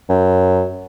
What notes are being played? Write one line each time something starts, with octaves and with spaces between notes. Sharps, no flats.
F#2